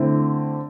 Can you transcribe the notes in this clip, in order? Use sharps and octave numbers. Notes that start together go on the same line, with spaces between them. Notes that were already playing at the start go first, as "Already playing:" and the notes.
Already playing: D3 A3 C4 E4